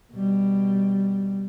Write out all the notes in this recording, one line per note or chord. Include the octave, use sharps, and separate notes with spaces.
B2 G3